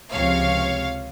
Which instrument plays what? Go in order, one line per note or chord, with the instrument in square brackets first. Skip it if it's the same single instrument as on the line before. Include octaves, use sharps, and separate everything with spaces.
[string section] C#2 C3 F3 C#5 F5